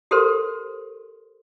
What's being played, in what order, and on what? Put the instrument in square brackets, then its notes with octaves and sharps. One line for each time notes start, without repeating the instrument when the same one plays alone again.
[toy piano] G4 A4 A#4 C5 C6